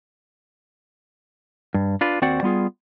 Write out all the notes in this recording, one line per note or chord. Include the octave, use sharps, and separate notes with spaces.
G2
D4 F4 B4
D#2 C4 F#4 C5 D5 F#5
G3 B3 F4 G#4